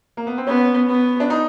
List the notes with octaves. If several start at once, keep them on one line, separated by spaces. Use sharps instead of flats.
A#3
B3
C4
B3 C#4
B3
D4
D#4